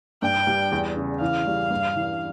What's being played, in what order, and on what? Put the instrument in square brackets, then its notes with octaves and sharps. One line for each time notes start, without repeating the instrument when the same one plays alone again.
[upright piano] G2 [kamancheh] G5
[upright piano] G3
E2
C#3
[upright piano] E3 [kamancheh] F5
[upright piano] G3
G2
E3